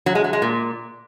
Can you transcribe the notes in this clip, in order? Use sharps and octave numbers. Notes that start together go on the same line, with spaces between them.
F#3
G#3
F#3
G#3
A#2